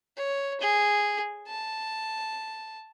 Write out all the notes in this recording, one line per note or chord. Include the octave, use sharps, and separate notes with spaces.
C#5
G#4
A5